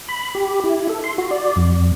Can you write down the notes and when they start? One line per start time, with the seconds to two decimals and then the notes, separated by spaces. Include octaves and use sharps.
0.08 B5
0.35 G4
0.64 E4
0.89 A4
1.04 C6
1.18 F#4
1.31 D5
1.56 F2